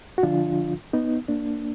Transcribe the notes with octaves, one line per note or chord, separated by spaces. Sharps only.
F#4
D3 F3 D4 F4
B3 D#4
A#3 D4